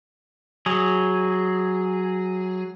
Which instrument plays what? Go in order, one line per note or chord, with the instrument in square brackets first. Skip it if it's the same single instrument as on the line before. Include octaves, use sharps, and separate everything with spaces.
[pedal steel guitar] F#3 G#4